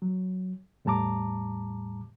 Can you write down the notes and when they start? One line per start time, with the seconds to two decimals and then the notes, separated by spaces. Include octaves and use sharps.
0.02 F#3
0.85 E2 A2 G3 A5 A#5 D6